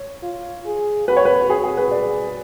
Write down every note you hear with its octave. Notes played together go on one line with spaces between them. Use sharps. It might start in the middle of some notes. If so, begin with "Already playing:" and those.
Already playing: C#5
F4
G#4
F#4 B4
C#5
B4
F#4 G#4
G#4
B4
G#4 D5